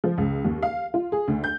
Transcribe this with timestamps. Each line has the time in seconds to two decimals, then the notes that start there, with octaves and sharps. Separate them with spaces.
0.04 F3
0.18 C#2
0.45 D#2
0.63 F5
0.94 F4
1.12 G#4
1.28 D2
1.44 G6